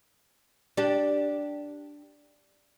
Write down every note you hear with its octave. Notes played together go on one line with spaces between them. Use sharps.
D4 G4